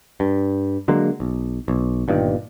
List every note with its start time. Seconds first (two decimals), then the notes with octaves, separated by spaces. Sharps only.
0.20 G2
0.88 D3 F#3 G#3 A#3
1.20 B1
1.68 B1
2.08 G1 G2 A#2 D#3